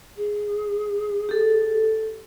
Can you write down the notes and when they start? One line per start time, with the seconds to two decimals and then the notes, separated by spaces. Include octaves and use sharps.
0.17 G#4
1.29 G4 A4